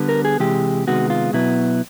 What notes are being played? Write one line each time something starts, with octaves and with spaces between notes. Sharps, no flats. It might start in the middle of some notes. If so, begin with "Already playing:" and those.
Already playing: D3 G3 B3
A#4
G#4
C3 E3 G#3 G4
C3 D#3 G#3 B3 F#4
F4
B2 F#3 B3 E4